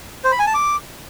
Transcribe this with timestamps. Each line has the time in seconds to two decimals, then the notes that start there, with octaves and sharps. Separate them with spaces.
0.24 C5
0.32 B5
0.39 G#5
0.47 A5
0.54 D6